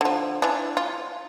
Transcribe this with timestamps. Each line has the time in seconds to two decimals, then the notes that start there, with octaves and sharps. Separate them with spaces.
0.01 D3 F3
0.42 E3 D4
0.77 F4